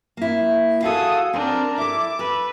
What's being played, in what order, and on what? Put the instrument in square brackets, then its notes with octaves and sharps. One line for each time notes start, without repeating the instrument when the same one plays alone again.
[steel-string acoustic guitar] A#3 E4
[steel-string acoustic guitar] F#4 G#4 F5 [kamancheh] A4 D#6
[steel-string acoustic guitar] C4 [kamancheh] D4 A#4
[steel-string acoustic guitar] E4 A4 [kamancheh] D6
[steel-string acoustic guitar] A4 [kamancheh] B4